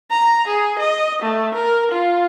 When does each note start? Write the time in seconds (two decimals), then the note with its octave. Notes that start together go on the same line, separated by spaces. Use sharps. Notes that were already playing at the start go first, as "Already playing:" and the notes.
0.11 A#5
0.47 G#4
0.79 D#5
1.22 A3
1.54 A#4
1.92 F4